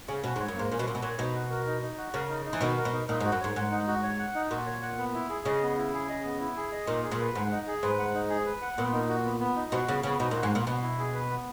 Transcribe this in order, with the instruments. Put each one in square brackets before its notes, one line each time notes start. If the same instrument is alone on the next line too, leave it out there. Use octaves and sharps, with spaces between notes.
[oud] C#3 [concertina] C#4
[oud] B2 [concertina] F#4
[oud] G#2
[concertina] C#5
[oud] F#2
[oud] G#2 [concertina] A#3
[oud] A#2 [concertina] C#4
[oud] B2
[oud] A#2 [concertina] F#4
[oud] B2
[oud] A#2 [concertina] C#5
[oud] B2 [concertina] D#4
[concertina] F#4
A#4
D#4
D#4
F#4
[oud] C#3 [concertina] A#4
[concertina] D#4
D#4
[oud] E3
[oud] B2 D#3 [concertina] F#4
[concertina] A#4
[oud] B2
[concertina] D#4
[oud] A#2 [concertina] D#4
[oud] G#2
[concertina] F#4
[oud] F#2
[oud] G#2 [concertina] C#5
[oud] G#2 [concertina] F#5
[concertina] D#4
F#4
C#5
F#5
D#4
[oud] A#2 [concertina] F#4
[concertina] C#5
F#5
B3
E4
G#4
[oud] C#3 [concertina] D#5
[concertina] B3
E4
G#4
D#5
B3
E4
G#4
D#5
[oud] A#2 [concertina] D#4
[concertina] G#4
[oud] A#2
[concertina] B4
[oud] G#2 [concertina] F#5
[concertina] D#4
G#4
[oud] G#2 [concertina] B4
[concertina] F#5
D#4
G#4
B4
F#5
[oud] A#2 [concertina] B3
[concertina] D#4
F#4
B3
B3
D#4
[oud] B2 [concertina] F#4
[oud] C#3 [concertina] B3
[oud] C#3 [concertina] B3
[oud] B2 [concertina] D#4
[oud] A#2
[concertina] F#4
[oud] G#2
[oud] A#2 [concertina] B3
[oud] B2 [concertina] B3
[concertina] E4
G#4
B4
B3